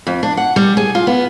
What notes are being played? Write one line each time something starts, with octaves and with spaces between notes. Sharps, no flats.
F2
D4
F#5
G3
G#4
F4
B3